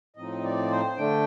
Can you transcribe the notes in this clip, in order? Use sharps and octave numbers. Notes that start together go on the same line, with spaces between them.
A2 F3 C4 D#4 D#5
D5
C5
D3 A3 D4 G5